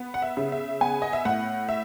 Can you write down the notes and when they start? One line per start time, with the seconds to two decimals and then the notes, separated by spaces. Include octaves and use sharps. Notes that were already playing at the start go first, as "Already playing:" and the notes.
Already playing: B3
0.14 F#5
0.22 E5
0.37 C#3
0.52 E5
0.81 B3 G#5
1.02 D#5
1.13 E5
1.25 A2 F#5
1.69 E5